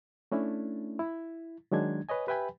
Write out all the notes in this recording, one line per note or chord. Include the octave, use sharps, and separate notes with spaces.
A3 C#4 D4 E4
E4
D#3 F#3 G#3 D4 G#6
B4 C#5 D#5 G#5
G4 B4 E5 G5 G#5 B5